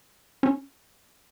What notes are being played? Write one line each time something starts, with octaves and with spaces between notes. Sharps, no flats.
C#4